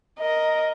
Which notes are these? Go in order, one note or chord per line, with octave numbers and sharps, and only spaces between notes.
A#4 D#5